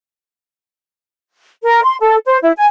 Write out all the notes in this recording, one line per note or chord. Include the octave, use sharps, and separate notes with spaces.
A#4
C6
A4
C5
E4
G#5